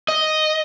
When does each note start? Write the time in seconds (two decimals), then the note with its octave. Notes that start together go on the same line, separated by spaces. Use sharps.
0.08 D#5